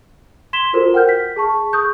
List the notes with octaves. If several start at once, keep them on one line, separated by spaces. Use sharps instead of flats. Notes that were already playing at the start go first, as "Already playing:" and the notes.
C6 G#6 B6 E7 G7
F4 F#4 A4 A#4 C5
F#5 G5 F6 G6
B6
G#4 A5 C#6
C#6 D#6 F#6 G6